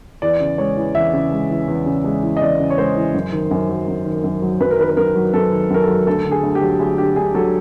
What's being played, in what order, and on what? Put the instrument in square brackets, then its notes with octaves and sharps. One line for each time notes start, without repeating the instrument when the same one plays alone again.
[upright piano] E2 D5
C#3
G#3 C#5
E3
E2 E5
C#3
G#3
E3
E2
C#3
G#3
E3
D#5
E2 D5
C#3
C#5
G#3 C5
E3
F#2
D#3
F#2
F#3
F#2
D#3
F#2
F#3
F#2 B4
A#4
D#3 B4
B4
F#2 A#4
F#3
F#2 A4
D#3
F#2 A#4
A4
F#3
D2 A4
D3
G#4
D2
G4
F#3
D2 G#4
D3 G4
D2 G#4
F#3 A4